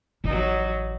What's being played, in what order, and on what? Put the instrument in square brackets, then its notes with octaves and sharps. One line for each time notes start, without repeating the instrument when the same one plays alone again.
[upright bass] A1 [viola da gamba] F#3 D#4